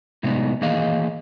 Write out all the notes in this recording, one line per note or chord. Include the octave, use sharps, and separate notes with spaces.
A2 C3 F#3 G#3 B3 D#4
D#3 E3 A#3 G#4 D#5 F5